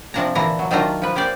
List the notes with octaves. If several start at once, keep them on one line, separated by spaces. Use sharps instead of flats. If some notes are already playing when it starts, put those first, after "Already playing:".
C3 F3 D4 A5 A#5
A#2 D3 E3 D4 E4 A#5
F#3
D#3 F#3 A3 D4 F4 A#5
F3 B4
A#3 G4 C5 D5 G5